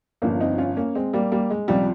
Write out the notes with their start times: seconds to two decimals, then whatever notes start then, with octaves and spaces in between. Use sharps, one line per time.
0.22 G1 G2 F3 A#3 C#4
0.40 C4 D#4
0.58 C#4 F4
0.77 A#3 C#4
0.95 G#3 C4
1.13 G3 A#3
1.32 G3 A#3
1.50 G#3
1.68 C#2 C3 F3 G3